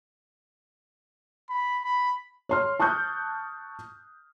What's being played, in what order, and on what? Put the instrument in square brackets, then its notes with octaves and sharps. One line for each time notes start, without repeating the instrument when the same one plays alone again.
[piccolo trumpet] B5
B5
[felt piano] C#5 C6 F6
A5 C#6 D#6 F#6 G6